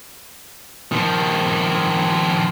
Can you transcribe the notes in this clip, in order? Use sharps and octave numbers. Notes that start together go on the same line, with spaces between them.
D#3 F3